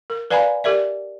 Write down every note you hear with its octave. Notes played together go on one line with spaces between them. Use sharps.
A#4
B4 D5 F5 G#5 A#5 B5
G4 A#4 D5 E5